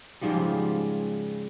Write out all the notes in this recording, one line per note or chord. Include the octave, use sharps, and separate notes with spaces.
G#2 C#3 F3 G3